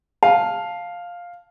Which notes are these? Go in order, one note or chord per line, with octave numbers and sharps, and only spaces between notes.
F5 A5